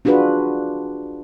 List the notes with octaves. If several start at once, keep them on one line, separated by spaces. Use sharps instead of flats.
D4 F4 F#4 G#4 B4